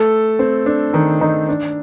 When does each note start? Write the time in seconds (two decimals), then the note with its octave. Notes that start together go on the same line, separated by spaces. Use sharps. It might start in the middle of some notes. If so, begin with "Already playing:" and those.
Already playing: A3 A4
0.39 C4
0.66 D4
0.93 D#3 D#4
1.21 D#3 D#4
1.48 D4